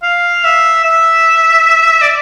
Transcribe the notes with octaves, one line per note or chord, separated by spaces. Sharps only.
F5
E5
E5
D5